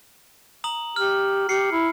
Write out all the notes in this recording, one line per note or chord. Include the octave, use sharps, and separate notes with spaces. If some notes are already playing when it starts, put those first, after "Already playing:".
A#5 D#6 F#7
G4 F6
G4 C7 C#7
E4